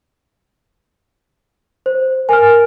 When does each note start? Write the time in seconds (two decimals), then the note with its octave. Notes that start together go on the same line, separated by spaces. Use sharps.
1.86 C5
2.29 A#4 G#5 F6